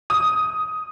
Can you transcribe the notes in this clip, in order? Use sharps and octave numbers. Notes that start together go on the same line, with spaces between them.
D#6